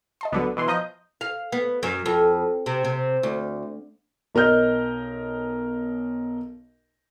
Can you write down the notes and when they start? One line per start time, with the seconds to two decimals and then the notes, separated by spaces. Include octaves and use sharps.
0.21 D#5 A5 C6
0.33 C#2 D3 F#3 B3
0.57 B2 E3 C6
0.68 F3 D#5 A#5 C6 G6 A#6
1.21 F5
1.52 B3
1.83 F#2
2.06 F2
2.66 C3
2.85 C3
3.23 D2
4.35 B1 A#4 D#5 F6 G6